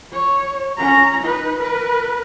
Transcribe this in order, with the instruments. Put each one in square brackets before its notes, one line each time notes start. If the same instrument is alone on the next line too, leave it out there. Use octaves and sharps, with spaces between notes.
[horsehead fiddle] C#5
C#4 A#5
D#4 B4
A#4 B4